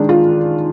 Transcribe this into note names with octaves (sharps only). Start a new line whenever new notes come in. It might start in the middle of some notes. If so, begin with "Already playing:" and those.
Already playing: D#3 G#3 D4
F4